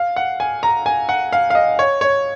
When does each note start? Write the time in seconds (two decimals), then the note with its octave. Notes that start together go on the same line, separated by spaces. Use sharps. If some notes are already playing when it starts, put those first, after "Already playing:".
Already playing: F5
0.16 F#5
0.40 G#5
0.63 A#5
0.86 G#5
1.09 F#5
1.33 F5
1.50 F5
1.55 D#5
1.79 C#5
2.01 C#5